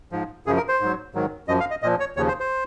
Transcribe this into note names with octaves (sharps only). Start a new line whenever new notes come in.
G#2 F3
F#2 C#3 F3 G#4
A#4
C5
G#2 F#3
G#2 D#3 F#3
F#2 F3 D#5
F5
D#5
A#2 F3 D#5
C#5
D#2 C#3 F3 C#5
C5
C5